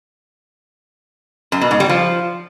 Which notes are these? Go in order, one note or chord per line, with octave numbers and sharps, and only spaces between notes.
F#2
B2
G#2
G3
F3